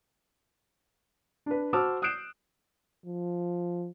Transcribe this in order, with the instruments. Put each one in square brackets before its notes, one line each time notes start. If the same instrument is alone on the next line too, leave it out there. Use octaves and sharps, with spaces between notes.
[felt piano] D4 B4
F#4 C5 A5 D6 E6 F6
D#6 F#6 G6 C7 D7 E7
[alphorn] F3